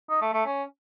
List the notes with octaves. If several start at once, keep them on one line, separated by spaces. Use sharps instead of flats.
D#4
A3
A3
C#4